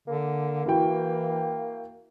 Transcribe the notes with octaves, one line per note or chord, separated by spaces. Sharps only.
D3 A#3
E3 E4 F#4 G5